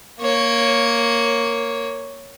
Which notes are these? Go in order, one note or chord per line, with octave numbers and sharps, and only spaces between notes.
A#3 C#5